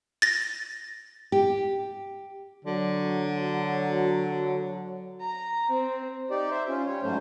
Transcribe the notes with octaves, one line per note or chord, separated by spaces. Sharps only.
A6 A#6
G4
D3 F#3
A#5
C4
D#4 G4 D5
C5 E5
C#4 F4
G3 C#5
G#2 F#3 A3 C#4 C5